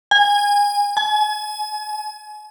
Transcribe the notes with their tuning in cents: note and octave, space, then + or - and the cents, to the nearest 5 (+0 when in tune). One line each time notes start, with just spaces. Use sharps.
G#5 -25
G#5 +35